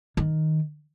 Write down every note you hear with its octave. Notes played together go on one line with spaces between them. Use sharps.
D#3